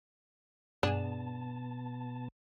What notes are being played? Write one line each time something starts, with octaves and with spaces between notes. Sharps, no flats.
G2 B2 B3 D4 G#4 G#5 A5